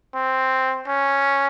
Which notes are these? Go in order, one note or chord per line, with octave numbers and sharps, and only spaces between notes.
C4
C#4